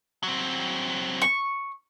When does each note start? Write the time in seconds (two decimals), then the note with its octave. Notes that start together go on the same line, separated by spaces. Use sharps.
0.23 F#3 C4
1.22 C#6